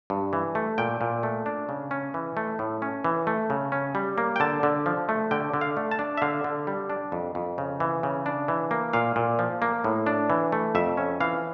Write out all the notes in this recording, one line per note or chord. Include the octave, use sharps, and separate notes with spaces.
G2
E3
A3
A#2 G5
A#2
A3
D4
C#3
C#4
E3
A3
A2
C#4
E3
A3
C#3
C#4
G3
A#3
G5
D3 A5
D3
F3
A3
D3 G5
D3
F5
A3
A5
D4
E5
D3 F5
D3
G3
D4
F2
F2
C#3
E3
C#3
D4
E3
A#3
A#2 F5
A#2
F3
A#3
A2
D4
E3
A3
F2 E5
C#4
E3 F5